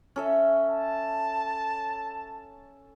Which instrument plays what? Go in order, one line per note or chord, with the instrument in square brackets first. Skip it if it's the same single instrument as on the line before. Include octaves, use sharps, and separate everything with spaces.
[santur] C#4 A4 E5
[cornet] A5